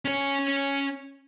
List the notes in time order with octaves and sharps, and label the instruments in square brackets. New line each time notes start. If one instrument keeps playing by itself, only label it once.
[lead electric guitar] C#4 C#5